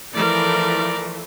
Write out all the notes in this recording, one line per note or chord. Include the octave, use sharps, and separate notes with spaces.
E3 F3 A3 A#4 D5